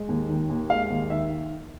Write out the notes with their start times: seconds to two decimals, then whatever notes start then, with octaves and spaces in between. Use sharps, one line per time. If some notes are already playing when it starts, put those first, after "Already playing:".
Already playing: G#3
0.09 D#2
0.29 D#3
0.49 D#2
0.70 G#3 F5
0.90 D#2
1.10 D#3 E5